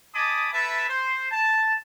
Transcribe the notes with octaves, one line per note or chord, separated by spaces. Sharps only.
D#5 G#5 A5 B5 D6 D#6
E4 A4 B4 E5 A5
C5
A5